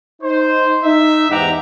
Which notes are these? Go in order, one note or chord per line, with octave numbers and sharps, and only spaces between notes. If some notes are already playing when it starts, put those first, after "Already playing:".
D#4 C5
D#4 E5
E2 G#2 G4 F#5 A#5